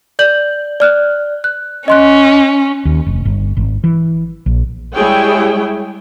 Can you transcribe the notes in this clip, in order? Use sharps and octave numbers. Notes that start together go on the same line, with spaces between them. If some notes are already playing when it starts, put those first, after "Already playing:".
D5 G6 F#7
D5 F6 F#6
F#6
C#4 D#5 C6 F#6
D#2
F1
G1
G#1
E3
A#1
G3 G#3 E4 G#4 C#5 G5